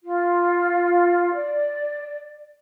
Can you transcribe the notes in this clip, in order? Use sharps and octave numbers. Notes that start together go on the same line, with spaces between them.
F4
D5